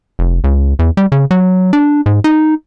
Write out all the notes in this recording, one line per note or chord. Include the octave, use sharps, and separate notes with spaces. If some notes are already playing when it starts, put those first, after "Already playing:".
F1
C#2
E2
G3
C#3
F#3
D4
G#2
D#4